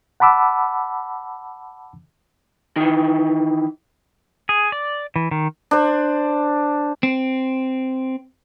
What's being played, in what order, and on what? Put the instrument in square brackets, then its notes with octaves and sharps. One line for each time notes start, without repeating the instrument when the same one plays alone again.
[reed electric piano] F#5 A5 B5 D6 E6
[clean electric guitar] D#3 E3
[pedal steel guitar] G#4
D5
E3
D#3
[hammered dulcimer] D4 C5
[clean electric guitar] C4